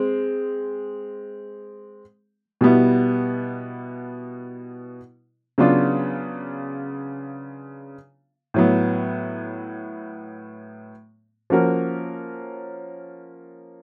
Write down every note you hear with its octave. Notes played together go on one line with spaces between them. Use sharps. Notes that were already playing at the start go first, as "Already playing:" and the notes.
Already playing: G#3 C4
B2 G3 B3 E4
C#3 F#3 B3 D4 F4
A2 F#3 B3
F3 A#3 C#4 F#4 A#4